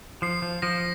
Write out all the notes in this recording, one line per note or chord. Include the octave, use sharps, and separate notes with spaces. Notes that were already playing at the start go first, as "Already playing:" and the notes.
F3 C7
F3
F3 A#6